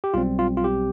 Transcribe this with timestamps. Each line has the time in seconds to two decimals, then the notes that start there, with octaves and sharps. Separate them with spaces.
0.04 G4
0.14 B1 B2 G3 C4 F4
0.39 F4
0.57 F4
0.64 G4